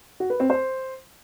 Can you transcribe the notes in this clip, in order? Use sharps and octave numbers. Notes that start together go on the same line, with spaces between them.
F#4
B4
C4
C5